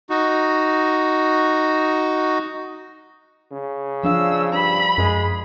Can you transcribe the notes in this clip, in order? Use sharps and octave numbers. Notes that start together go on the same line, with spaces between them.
D#4 F#4
C#3
F3 D4 F5 E6
G2 B5
F#2 G#3